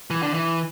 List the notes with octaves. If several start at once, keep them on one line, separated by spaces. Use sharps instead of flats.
E3
D3
E3